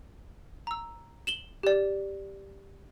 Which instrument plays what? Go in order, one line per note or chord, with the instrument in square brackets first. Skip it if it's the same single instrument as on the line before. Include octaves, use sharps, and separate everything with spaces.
[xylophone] A#5 E6
E7 F#7 G7
G4 D5